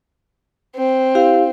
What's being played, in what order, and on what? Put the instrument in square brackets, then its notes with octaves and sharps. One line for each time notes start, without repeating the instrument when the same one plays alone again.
[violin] C4
[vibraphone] E4 G4 F5